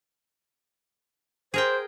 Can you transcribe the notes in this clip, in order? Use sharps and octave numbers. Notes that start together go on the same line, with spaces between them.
G#4 A#4 C5 G5